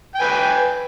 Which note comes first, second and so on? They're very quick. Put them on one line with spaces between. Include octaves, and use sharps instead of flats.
G5 G#5 B4